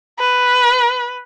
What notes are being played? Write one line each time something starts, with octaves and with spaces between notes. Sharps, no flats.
B4